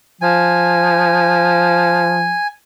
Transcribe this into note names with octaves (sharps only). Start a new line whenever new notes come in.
F3 G#5